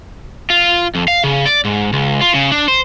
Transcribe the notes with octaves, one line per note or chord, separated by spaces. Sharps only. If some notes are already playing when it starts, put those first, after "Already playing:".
F4
F2
F5
C#3
D5
G#2
C#2
F4
C#3
D4
C5